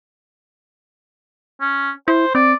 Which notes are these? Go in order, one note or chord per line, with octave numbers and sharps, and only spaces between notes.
C#4
E4 C5
C4 D5